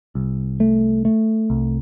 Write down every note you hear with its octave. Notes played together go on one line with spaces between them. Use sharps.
C2
A3
A3
C2